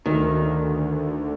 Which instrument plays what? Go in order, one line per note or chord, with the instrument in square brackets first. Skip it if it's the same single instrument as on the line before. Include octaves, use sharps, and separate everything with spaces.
[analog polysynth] D2 [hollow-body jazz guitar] D#3